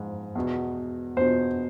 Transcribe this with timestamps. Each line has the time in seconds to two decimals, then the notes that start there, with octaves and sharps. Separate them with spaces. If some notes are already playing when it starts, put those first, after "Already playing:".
Already playing: G#2 F3
0.35 E2 B2
1.17 E2 B2 C5